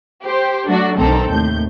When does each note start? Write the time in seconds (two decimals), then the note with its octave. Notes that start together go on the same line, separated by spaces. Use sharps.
0.24 G4 C5
0.68 F#3 A3 D4 F#4
0.98 B1 D3 D#3 C4 A4 A#5
1.29 D#2 A2 C3 G6